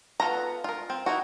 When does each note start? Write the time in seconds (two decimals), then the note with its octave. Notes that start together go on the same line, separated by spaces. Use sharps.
0.20 B3 F4 F#4 A4 A#5
0.64 F4 A#4
0.90 C4
1.06 D#4 E4 F#4